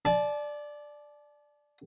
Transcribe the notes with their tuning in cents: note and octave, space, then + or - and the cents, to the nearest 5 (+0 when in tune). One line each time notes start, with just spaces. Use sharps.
D5 +5 A5 -35